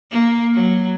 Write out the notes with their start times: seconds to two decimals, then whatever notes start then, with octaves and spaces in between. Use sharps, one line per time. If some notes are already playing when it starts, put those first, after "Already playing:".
0.11 A#3
0.54 F#3